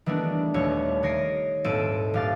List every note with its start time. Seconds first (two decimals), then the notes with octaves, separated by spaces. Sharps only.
0.06 D#3 E3 G3 A3 B3 D4
0.54 D#1 D#2 G3 A3 C#5
1.03 D#3 C#5 A#6 C7 D7 D#7
1.64 D#1 G#2 C4 A4 D7 D#7
2.14 D#1 G4 F5 D6 A6